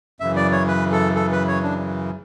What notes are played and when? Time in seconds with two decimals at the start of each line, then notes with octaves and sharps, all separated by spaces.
0.20 F#2 C#3 E3 E5
0.36 D5
0.52 C#5
0.68 B4
0.92 A4
1.16 A4
1.32 B4
1.48 C#5
1.63 D4